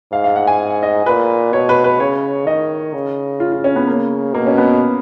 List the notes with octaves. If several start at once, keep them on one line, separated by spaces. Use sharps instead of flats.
G#2 F5
F5
F#5
G#5
D#5
A#2 B4
B2 C#5
B4
B4
C#3 C#5
D#3 D#5
C#3
F4
F4
C#4
B3
A#3
B2 A#3
C#4
B3